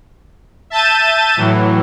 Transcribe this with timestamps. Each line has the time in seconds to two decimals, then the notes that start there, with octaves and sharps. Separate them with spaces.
0.70 E5 A5 G6 A6 D#7
1.37 A2 E3 F#3